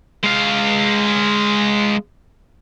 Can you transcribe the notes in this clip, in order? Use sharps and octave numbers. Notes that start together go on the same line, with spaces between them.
G#3 F5